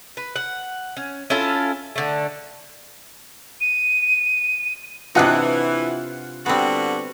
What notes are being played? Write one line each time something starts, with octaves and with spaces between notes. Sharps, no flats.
B4
F#5
C#4
C#4 E4 F4 A4
D3 A3
D#7
C3 E3 D4 D#4 F4 F#5 F#6
D3 G3 B3 C4 F#4